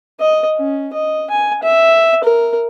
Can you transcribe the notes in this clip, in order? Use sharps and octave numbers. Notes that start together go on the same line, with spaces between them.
D#5
C#4
D#5
G#5
E5
A#4